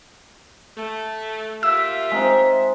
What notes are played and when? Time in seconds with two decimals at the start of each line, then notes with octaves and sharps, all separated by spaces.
0.77 A3
1.63 A#3 F4 G4 E5 E6
2.11 G#3 C4 D#4